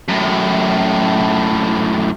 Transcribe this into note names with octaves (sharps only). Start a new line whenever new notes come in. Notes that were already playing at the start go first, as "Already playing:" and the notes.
F#2 A2